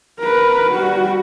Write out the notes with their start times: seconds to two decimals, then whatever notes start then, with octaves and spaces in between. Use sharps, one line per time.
0.19 A#4 B4
0.71 G3 F#4